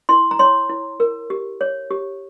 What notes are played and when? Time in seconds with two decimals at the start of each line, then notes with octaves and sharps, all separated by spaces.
0.09 E4 C6
0.31 A#5
0.39 C#5 C6
0.70 E4
1.00 A#4
1.30 G4
1.61 C#5
1.91 G4